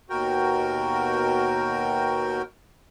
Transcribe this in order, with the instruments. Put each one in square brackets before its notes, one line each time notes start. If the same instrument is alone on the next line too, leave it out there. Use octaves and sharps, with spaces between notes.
[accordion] D#2 B2 F#4 A#4 G5